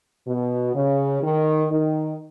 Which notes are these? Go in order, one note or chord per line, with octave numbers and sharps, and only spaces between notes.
B2
C#3
D#3
D#3